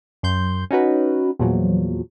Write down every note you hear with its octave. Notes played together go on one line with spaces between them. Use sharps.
F#2 C6 G6
C#4 D#4 F#4 B4
E2 A#2 F3 F#3